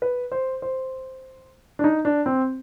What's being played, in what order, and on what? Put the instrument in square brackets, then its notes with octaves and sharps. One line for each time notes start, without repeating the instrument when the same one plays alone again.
[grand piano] B4
C5
C5
D4
D#4
D4
C4